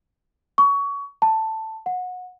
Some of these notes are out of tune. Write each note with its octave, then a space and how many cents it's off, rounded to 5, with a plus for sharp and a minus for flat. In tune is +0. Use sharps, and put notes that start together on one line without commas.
C#6 +25
A5 +10
F#5 -25